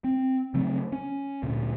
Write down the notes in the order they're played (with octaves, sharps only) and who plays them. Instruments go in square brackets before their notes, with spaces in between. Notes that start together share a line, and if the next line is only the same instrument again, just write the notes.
[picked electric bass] C4
C#3 F#3 A3 C4
C#4
D2 A#2